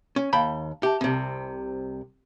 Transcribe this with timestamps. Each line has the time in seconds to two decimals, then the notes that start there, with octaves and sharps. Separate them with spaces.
0.16 C#4
0.33 D#2 F5 G5 A5 B5
0.83 G4 E5 A5
1.01 C2 C3 C4 G4